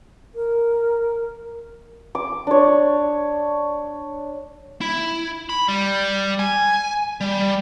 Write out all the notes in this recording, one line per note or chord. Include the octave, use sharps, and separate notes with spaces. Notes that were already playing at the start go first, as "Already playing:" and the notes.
A#4
D6
D4 C#5
E4
B5
G3
G#5
G3